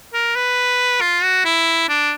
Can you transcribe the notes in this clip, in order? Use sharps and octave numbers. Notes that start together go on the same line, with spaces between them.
A#4
B4
F4
F#4
E4
D4